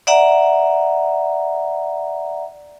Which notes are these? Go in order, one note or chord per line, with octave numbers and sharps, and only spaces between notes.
D5 E5 F#5 A#5